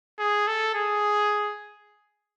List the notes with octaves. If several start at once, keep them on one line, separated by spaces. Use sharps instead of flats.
G#4
A4
G#4